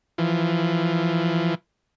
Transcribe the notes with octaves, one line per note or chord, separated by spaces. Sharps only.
E3 F3